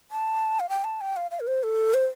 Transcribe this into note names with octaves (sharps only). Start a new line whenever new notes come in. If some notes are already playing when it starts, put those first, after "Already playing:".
A5
F5
G5
A5
G5
F5
F5
A#4
C5
A4
C5